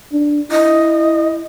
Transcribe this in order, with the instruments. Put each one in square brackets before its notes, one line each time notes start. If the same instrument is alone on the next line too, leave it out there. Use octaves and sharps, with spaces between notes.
[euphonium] D4
[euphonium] E4 [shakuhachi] D#5